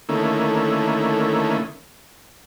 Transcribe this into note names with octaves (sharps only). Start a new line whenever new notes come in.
D3 D#3 A3 A#3 C#4 E4